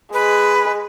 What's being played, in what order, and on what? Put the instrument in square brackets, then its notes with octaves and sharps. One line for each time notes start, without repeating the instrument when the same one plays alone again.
[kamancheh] G#3 [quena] B4